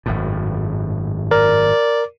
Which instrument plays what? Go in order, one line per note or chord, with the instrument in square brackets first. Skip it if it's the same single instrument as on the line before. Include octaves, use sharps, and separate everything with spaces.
[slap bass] G#1 F#2 A2
[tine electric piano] A#4 [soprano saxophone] D5